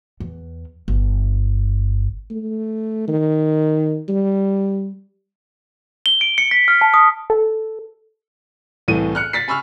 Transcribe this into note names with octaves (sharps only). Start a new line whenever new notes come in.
E2
G1
A3
D#3
G3
G7
D7
C#7
B6
F6
A5
D#6
A4
C2 A2 E3 A3 D#7
F6 F#6 C#7
A6 B6 C7
G#5 B5 C#6 E6 F6